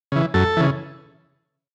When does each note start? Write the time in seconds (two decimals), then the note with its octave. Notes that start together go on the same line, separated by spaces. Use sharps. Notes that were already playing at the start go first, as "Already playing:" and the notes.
0.12 C#3 E3
0.34 F#2 A4
0.57 C#3 E3